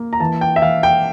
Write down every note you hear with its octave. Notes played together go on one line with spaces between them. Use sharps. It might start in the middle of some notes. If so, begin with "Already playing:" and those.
Already playing: A#3
A#5
E3 A5
G5
E5
E3 F5
G5